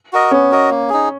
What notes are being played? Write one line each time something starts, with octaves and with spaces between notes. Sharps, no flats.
F#4 A#4 D#5
B3 C#4
F#4 A#4 D#5
A#3
D#4 G#4